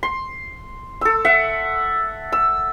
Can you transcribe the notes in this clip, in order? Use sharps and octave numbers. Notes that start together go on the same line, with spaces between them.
C6
A4 E6
E5 F#5
E6